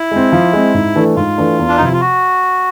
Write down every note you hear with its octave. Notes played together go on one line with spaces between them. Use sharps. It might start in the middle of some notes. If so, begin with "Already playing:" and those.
Already playing: E4
G#3 C4
F3
G#3 C4
G#2
E3 A3 D4
G#2 F4
E3 A3 D4
E2
D4
D#4
C3 F3 E4
F4
F#4